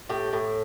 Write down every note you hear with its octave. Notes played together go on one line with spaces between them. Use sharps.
A2 G4
A2